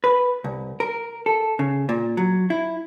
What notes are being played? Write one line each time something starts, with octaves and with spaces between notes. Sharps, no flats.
B4
C2
A#4
A4
C#3
A#2
F#3
E4